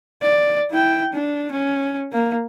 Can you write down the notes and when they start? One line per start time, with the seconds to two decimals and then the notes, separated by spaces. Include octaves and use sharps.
0.22 D5
0.71 E4 G5
1.13 D4
1.52 C#4
2.12 A#3